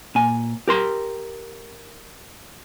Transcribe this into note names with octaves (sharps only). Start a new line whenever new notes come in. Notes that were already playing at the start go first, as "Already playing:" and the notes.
A#2 G#5
G4 A#4 C6